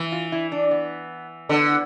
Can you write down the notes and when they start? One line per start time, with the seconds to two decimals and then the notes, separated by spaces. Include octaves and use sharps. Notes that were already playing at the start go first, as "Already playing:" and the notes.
Already playing: E3
0.12 F4
0.32 E4
0.52 D4
0.71 B3
1.49 D3 B3